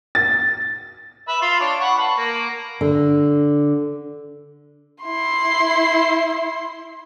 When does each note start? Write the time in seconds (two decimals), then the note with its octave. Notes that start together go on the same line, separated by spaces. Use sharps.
0.15 A6
1.28 B4 E5
1.42 F4 F5 C6
1.61 D4 C#5
1.80 F#5 B5 C#6
1.98 B4 A5 B5
2.18 A#3
2.81 D3
5.03 E4 C6